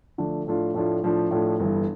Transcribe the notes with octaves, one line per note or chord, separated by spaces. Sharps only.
D3 F3 A3 D4
A2 F3 A3 D4 F4
A2 F3 A3 D4 F4
A2 F3 A3 D4 F4
A2 F3 A3 D4 F4
G1 G2 E3